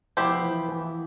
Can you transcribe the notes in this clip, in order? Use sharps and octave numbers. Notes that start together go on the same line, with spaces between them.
F3 B3 E4 G4 C5
E3
E3